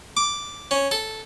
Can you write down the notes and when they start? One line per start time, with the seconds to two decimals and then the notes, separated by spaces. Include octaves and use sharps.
0.17 D6
0.71 C#4
0.91 A4